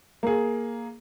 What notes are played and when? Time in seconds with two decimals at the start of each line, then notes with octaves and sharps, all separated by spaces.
0.23 A#3 G#4